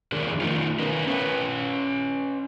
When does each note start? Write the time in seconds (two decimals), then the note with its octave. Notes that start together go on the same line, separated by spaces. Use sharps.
0.12 F2 D#3 D4 G#4 A#4
0.41 D#3 A3 D#4 F4
0.79 C#4 A#4 B4
1.08 C#4 B4